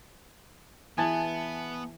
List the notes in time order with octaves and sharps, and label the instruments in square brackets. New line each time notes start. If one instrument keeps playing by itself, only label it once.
[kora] E3 E4 G#4 [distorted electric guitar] B3 [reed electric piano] G#5 A5